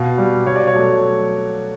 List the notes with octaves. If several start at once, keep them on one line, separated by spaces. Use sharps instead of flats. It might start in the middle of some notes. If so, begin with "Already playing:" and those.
Already playing: B2 F5
G3
B2 C#5
D5
C#5
F#3 A3